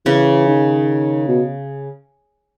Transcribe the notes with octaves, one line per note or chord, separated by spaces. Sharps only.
C#3 E3 C#4
D#3
B2